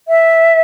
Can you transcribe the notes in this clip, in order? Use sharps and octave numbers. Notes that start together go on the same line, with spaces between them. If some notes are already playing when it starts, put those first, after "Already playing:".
E5